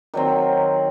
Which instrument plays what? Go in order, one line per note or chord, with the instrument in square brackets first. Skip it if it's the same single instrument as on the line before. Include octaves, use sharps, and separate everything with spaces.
[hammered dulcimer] D#3 F#3 C4